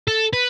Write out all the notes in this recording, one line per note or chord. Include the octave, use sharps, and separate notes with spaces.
A4
B4